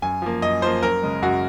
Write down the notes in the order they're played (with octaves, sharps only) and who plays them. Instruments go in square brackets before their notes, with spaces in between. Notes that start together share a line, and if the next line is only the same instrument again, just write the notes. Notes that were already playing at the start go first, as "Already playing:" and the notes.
[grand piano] F#2 G#5
F3 A#3
F#2 D#5
F3 A#3 C5
F#2 A#4
C#3 G#3
F#2 F#4